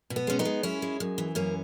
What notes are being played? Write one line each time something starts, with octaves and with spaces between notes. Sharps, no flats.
B2
B3
G#3 C#4
B3 D#4
G#3
F#2 C#4 E4
G#3
F#2
E3
F#2 A#3 C#4